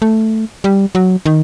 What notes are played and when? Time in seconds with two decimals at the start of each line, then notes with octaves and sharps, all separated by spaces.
0.02 A3
0.64 G3
0.95 F#3
1.26 D#3